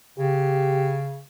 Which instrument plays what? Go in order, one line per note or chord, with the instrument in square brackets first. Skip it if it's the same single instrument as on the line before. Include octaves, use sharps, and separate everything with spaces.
[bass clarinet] C#3 [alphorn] G4